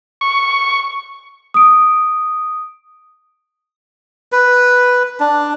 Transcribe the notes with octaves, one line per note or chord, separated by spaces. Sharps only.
C#6
D#6 D7
B4
D4